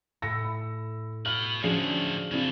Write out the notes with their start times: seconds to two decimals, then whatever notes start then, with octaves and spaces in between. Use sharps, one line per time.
0.22 A2 E6 A#6 C#7
0.44 B5
1.26 F#4 B5 F6
1.63 A2 D3 F3 C#4 D4 F#4 G#4 C7
2.32 C#3 C4 D4 E4 A4